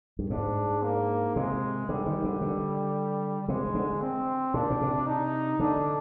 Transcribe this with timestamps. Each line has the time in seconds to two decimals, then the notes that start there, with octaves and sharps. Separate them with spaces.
0.19 G2
0.30 G#2 D4
0.83 A#3
1.36 C3 G#3
1.89 D3 G3
2.06 D#3
2.24 D3
2.41 D3
3.48 C3 G#3
3.75 D3
4.01 C4
4.54 A#2 D4
4.70 A#2
4.81 C3
5.06 D#4
5.60 D3 D4